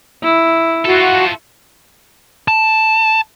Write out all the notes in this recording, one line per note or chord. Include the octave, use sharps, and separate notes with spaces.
E4
F4 F#4 A4
A5